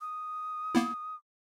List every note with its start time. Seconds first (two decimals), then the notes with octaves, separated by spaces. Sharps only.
0.01 D#6
0.75 A#3 B3 E4